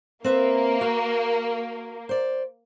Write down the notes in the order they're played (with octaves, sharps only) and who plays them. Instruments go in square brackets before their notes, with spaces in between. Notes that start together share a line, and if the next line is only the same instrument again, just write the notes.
[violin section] A#3 [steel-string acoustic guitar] C4 B4 E5
[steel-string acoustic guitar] F#4
C5 D5